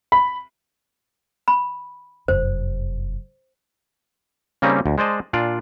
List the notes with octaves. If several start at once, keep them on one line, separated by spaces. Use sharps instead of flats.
B5
B5
F1 F#2 C5
C#3 G3 A#3 C4 C#4 D#4
D2
G#3 C5 D5 D#5 A5
A#2 D4 F4 D5